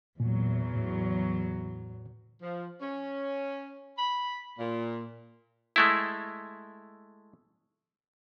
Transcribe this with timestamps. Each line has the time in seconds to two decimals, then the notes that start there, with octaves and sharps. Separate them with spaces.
0.20 E2 A#2 F#3
0.74 A2
2.42 F3
2.82 C#4
3.98 B5
4.59 A#2
5.76 G#3 A3 E4